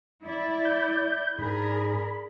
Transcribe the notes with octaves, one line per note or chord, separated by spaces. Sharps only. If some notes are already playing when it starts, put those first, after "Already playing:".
E4 D5
G6
G#2 D4 G#4 A#4 B5